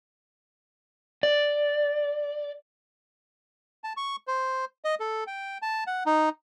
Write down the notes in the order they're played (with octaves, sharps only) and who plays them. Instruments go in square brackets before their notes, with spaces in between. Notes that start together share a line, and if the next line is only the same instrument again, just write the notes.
[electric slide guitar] D5
[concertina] A5
C#6
C5
D#5
A4
G5
A5
F#5
D#4